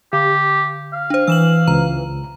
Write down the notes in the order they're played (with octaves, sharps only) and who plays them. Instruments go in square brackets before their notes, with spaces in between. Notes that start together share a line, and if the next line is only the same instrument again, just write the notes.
[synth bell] D3 [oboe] G4
[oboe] F5
[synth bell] D4 C5
[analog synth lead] E3 [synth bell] E6 E7 F#7
[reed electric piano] C#2 [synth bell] A#5